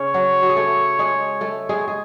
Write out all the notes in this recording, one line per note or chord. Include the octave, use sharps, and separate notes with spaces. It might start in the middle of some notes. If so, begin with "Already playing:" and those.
Already playing: C#3 C#4 C#5
F#3 F#4
F#4
G#4
A3 A4
G#3 G#4
A3 A4
G#3 G#4
G#4